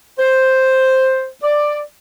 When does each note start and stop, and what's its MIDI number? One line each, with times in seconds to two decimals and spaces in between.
0.19 1.28 72
1.43 1.80 74